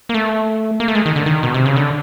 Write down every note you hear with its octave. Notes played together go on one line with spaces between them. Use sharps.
A#3
A3
A#3
A3
G#3
D#3
D3
D#3
B2
C3
C#3
D3